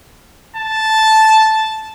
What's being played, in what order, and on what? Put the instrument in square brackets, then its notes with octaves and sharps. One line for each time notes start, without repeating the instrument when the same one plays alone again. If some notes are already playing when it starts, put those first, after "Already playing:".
[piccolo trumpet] A5